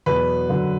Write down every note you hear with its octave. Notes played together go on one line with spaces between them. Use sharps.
E2 B2 F#3 B4
F#2 D3 F#3